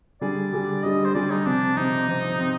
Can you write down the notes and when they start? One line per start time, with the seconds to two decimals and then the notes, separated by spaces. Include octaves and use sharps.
0.21 D3 G3 D4 G#4 D5
0.52 D3 G3 D4 G#4
0.83 D3 G3 D4 G#4 D#5
1.05 C5
1.14 D3 G3 D4 G#4 D5
1.31 D#4
1.46 C3 F3 C4 D4
1.76 C3 F3 C4 D#4
2.08 C3 F3 C4
2.39 C3 F3 C4